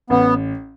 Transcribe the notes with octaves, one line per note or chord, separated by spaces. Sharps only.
A1 B3